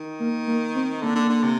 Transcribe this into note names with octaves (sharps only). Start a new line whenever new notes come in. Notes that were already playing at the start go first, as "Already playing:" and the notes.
Already playing: D#3
A#3
A#3
C4
D3 A#3
D3
D3
C3